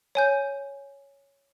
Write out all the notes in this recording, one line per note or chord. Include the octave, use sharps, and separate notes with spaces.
C#5 G#5 G6